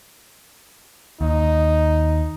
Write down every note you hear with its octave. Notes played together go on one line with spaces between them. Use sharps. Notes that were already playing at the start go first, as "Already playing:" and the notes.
D#2 D#4